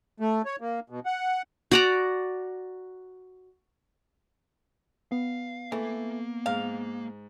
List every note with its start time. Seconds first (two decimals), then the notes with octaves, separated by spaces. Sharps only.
0.20 A3
0.45 C#5
0.61 A#3
0.90 B2
1.06 F#5
1.71 F#4 D5 A#5
5.12 B3 F5
5.72 E3 A3 A#3
6.46 G#2 F5